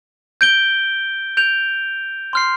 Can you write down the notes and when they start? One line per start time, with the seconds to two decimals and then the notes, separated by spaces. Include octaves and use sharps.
0.41 G6 D7 G7
1.37 G6 D7 F7
2.33 C6 F6 C7